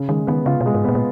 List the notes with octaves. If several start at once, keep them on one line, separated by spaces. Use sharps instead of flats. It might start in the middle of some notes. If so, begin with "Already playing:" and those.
Already playing: C#3
D#3 G#3
D#3 B3
C#3 F4
B2
G#3
G#2
A#2 B3
A#2